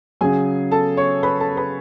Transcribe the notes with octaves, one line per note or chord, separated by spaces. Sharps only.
C#3 F#3 G#4 G#5
A4 A5
C#5 C#6
B4 B5
A4 A5
B4 B5